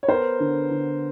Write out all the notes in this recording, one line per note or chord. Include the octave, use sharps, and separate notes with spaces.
C#5
B3 A#4 C5
D3
D3